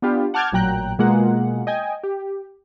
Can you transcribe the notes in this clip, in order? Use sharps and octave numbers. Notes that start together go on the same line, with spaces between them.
B3 D4 F4 G4
F#5 A5 D6 F6 G6 G#6
A1 A#2 F#3 G5 A#5 F#6
B2 G#3 A#3 F4 F#5
D#5 G5 G#5
G4